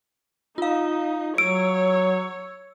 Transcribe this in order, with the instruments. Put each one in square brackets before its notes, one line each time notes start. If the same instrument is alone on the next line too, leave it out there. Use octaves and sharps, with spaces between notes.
[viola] D#4 [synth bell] F4 F5
[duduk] F#3 [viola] C#5 [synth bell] E6 [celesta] D7